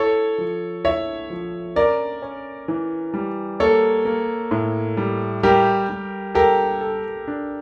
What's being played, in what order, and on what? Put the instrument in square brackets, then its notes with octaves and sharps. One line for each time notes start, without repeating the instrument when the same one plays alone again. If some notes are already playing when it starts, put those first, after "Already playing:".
Already playing: [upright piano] E4 [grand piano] A4 C#5
[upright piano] F3
[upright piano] E4 [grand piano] C#5 E5
[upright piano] F3
[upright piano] C#4 [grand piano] A#4 D5
[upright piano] C#4
E3
G3
[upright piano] A#3 [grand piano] A4 C#5
[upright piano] A#3
A2
G3
[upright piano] G3 [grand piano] G4 A#4
[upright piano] G3
[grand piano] G4 A#4 [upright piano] A4
[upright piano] A4
D4